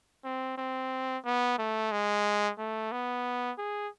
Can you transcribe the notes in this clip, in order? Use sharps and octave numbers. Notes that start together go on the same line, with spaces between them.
C4
C4
B3
A3
G#3
A3
B3
G#4